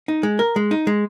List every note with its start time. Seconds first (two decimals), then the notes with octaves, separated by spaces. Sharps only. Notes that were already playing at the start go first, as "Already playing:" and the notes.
0.08 D#4
0.23 G#3
0.39 A#4
0.56 G#3
0.71 D#4
0.87 G#3